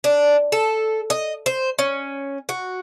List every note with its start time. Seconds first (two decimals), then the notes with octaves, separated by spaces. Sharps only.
0.04 D4
0.52 A4
1.10 D#5
1.46 C5
1.79 C#4
2.49 F#4